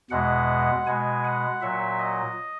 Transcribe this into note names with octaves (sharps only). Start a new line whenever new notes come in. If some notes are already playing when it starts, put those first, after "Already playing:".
E2 B2 G#3 F#5
B2 G#3 G#5
F#5
A#2 F#3 E5
D#5